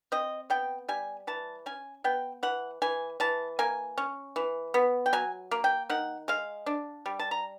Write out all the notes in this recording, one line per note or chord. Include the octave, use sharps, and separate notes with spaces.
C4 D#5
B3 G5
G3 G#5
E3 A5
C#4 G#5
B3 G5
E3 F#5
E3 G#5
E3 A5
A#3 G#5
C#4
E3
B3
G5
F#3 G#5
A#3
G5
D#3 F#5
G#3 F5
D4
G3
A5
A#5